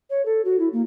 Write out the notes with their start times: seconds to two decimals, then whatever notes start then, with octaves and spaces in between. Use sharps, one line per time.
0.10 C#5
0.25 A4
0.45 F#4
0.59 E4
0.73 A#3